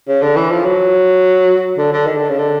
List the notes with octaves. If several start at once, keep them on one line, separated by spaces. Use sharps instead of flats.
C#3
D3
E3
F3
F#3
D3
D3
D#3
D3
C#3
D3